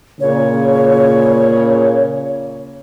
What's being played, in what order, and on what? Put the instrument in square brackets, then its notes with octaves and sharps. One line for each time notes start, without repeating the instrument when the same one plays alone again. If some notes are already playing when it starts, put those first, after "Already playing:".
[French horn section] A#2 C#3 [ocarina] C#5